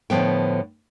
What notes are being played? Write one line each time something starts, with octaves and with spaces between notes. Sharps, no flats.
A2 D3 F3 B3 G5